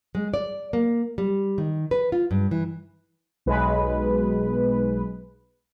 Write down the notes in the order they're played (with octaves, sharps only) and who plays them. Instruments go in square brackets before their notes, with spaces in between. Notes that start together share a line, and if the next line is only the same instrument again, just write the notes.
[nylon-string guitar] G#3
D5
A#3
G3
D#3
B4
F4
G2
E3
[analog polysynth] B1 G#3 B4